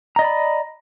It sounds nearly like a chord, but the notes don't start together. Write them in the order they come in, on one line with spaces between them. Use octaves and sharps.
A#5 D#5 D5 B5